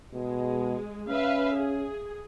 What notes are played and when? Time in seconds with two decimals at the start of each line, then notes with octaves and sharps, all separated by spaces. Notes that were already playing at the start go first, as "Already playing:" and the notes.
0.14 B2 G#3
1.09 C#4 B4 E5 F5
1.55 G#4